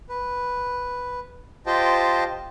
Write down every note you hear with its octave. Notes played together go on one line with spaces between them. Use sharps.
B4
F4 G4 C5 D#5 G5 A5